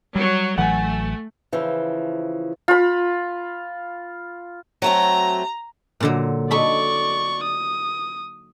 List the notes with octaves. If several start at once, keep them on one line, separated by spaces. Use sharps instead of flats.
F#3 G3
A1 E3 F#3 A3 F#5 G#5
C#3 E3 F3
F4 B5
F#3 A3 C4 A#5
A#2 D3 F#3
D#4 A4 D5 B5 C#6
D#6